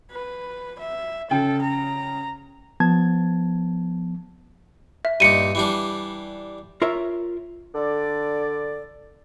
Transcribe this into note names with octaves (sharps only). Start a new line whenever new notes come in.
B4
E5
C#3 A4 G5
A#5
F3 B3 A5 G#6
E5
G2 A#2 D#4 C#7 D#7
E3 G3 D4
F4 A#4 C#5 E5
D3 D5